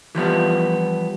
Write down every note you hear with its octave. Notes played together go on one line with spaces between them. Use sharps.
E3 F3 G3 B3